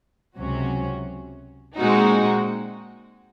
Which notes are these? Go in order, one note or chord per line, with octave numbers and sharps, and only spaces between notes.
C#2 C3 F#3 C#4 F#4
A#2 G#3 C4 D#4 F#4